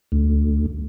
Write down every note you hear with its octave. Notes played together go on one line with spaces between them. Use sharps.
D2